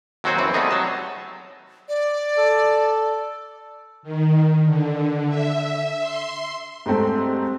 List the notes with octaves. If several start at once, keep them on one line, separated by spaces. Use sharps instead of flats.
D#2 F#3 C4 F#4 C5 G#5
F#2 E3 C4
G3 A3 B3 C4 D#4 G#4
F#3 A5
D5
A4
D#3
D3
E5
C6
G#2 G3 A3 C4